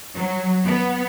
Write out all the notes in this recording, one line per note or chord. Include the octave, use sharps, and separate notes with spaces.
F#3
B3